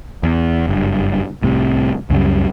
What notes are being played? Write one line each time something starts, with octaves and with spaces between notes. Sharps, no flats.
E2
F#1 G2
C2 A2 C3
C#2 F#2 C#3 G3